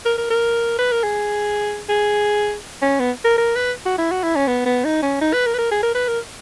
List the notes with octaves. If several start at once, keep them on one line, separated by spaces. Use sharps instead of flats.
A#4
A#4
A#4
B4
A#4
G#4
G#4
C#4
B3
A#4
A#4
B4
F#4
E4
F#4
E4
C#4
B3
B3
D#4
C#4
D#4
B4
A#4
B4
A#4
G#4
A#4
B4
A#4